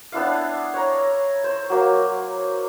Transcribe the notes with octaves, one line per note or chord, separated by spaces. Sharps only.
B3 D4 E4 F5
C#5 A#5
C5
F#3 A#3